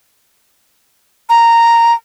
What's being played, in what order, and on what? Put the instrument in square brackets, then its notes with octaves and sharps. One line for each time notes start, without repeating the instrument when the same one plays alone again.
[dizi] A#5